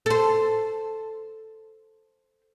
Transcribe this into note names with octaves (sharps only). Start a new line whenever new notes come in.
A4 C5